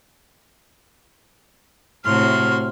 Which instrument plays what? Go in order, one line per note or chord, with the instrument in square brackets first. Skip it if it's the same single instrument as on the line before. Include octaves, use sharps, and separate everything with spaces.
[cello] A2 C3 [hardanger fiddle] F#4 C6 [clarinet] F6